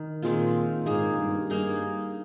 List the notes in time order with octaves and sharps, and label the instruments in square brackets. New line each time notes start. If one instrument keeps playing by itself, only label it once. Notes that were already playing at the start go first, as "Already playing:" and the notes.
Already playing: [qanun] D#3
[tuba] A#2 [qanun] D#3 G#3 C4 F4
[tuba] G#2 [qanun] A#3 D#4 G#4
[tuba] G2
[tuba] G2 [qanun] A#3 D#4 G#4